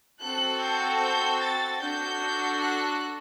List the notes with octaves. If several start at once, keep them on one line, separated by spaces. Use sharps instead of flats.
C4 F#4 A4 F#6
G6
G6
A6
D4 F#4 A4 G6
F#6